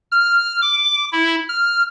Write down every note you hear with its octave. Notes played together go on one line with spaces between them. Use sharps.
F6
D6
E4
F6